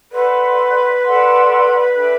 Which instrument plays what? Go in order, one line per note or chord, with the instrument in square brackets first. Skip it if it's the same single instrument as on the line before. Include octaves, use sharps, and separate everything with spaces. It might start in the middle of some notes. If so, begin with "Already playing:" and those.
[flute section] A4 D5 F#5 C6 [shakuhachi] B4
[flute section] A4 D5 F#5 C6
D4 A4 E5 G5